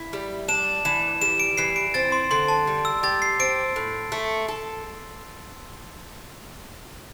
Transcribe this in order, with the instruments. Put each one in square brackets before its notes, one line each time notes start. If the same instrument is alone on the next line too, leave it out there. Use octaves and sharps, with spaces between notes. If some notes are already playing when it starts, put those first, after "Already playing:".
Already playing: [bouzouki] E4
G3
[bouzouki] D4 [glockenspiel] E7
[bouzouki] E3 [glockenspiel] E7
[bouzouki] G3 [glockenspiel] E7
[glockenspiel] D7
[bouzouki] E3 [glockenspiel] C7
[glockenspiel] D7
[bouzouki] C4 [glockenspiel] A6
[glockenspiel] C6
[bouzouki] D3 [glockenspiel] C6
[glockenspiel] A5
[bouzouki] G3
[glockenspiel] E6
[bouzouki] G4 [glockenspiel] A6
[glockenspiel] C7
[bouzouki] C4 [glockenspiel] D7
[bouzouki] A2
A3
A4